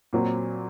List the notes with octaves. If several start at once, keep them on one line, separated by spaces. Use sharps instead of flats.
A#2 F#3 C4